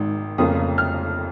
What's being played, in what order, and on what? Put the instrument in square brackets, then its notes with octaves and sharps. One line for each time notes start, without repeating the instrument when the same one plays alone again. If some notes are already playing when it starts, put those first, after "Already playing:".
Already playing: [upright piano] G#1 G#2 D#3
F1 F2 C#3 A#3 F4 D#6
F6